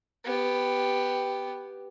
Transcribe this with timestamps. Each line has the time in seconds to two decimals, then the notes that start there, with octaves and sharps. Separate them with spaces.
0.24 B3 G4